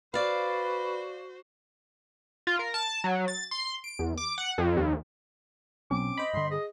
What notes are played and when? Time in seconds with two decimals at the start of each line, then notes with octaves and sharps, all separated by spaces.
0.14 F#4 B4 C5 D5 F5
2.47 F4
2.59 A#4
2.74 A5
3.04 F#3
3.28 A6
3.51 C6
3.84 D7
3.99 E2
4.17 D6
4.38 F#5
4.58 F2
4.77 D#2
5.91 B1 C4 C#4 D6
6.18 C5 D#5 B5
6.34 G2 D3 C6
6.50 G#4 D#5